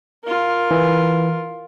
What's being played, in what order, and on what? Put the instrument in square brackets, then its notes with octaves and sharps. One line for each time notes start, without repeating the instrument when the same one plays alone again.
[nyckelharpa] F4 A#4
[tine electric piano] E3